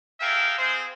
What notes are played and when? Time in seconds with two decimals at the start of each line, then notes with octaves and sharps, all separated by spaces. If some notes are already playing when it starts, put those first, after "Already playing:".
0.20 A3 G#4 A#4 E5 F5 G5
0.58 C4 G#4 C5